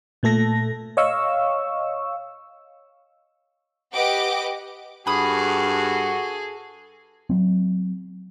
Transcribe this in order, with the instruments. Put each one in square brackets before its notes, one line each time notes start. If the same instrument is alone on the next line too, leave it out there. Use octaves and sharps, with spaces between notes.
[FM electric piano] A#2 A3 A4 A#6
C#5 D#5 F5 C#6 E6
[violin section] G4 B4 D#5 F#5 D6 D7
[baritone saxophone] G2 [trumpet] F#4 [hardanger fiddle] G#4 A4 [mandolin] B5 D#6
[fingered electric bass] F#3 C4